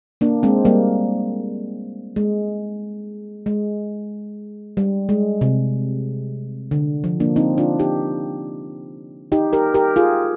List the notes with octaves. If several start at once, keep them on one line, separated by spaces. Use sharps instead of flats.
A#3 D4
G#3 C4
G3 A#3
G#3
G#3
G3
G#3
C3
D3
F3
A#3 D4
C4 D#4
D4 F4
D#4 G4
D#4 G4
G4 A#4
G4 A#4
F4 G#4